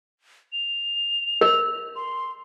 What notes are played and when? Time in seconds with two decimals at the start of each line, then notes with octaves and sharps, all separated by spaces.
0.53 F7
1.41 A#4
1.96 C6